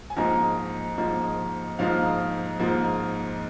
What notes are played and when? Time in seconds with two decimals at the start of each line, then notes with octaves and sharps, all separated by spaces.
0.10 G#5
0.16 G#2 F3 A#3 D#4 A#5
0.98 G#2 F3 A#3 D#4
1.79 G#2 F3 A#3 D#4 F5
2.59 G#2 F3 A#3 D#4